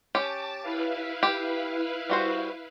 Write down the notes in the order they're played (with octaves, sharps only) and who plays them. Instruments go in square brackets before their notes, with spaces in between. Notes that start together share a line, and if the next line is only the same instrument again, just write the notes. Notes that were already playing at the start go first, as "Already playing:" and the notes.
[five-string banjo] C#4 G4 [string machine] A5 D6 A6
[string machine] E4 B4 F5
[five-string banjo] G4
G3 F#4 C5